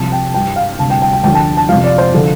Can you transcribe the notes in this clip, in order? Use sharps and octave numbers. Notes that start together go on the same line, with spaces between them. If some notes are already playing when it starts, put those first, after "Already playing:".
Already playing: C2 C3 F3 A5
G5
G2 G3 G5
F5
D2 C3 G3 A5
G5
G5
G5
D2 D3 F3 G5
A5
A5
F2 C3 F3 F5
D5
C5
D3 F3 A4